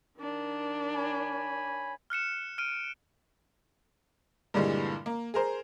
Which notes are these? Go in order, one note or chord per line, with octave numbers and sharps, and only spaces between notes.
D#3 D4
C#5 G#5 B5
F6 F#6 C#7 E7
F6 D7 D#7
G2 A#2 D3 E3 G3 G#3
A#3
G#4 A#4 C5